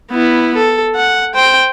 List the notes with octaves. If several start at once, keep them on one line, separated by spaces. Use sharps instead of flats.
B3 E4
A4
F#5
C5 G5